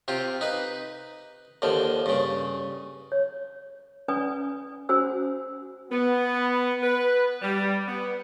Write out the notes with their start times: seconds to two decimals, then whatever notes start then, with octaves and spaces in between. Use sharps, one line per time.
0.08 C3 F4 G4
0.41 D#4 B4
1.62 D#2 D3 F3
2.06 G2 C#3
3.12 C#5
4.08 C#4 B4 D5 G#5 D#6
4.89 C#4 F#4 C5 G#5 E6
5.91 B3
6.83 B4
7.42 G3
7.87 B3